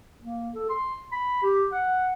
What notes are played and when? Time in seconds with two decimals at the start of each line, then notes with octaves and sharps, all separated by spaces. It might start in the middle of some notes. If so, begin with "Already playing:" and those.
0.22 A#3
0.55 A4
0.69 C6
1.12 B5
1.42 G4
1.72 F#5